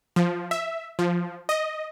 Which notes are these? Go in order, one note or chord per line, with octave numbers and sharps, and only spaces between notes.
F3
E5
F3
D#5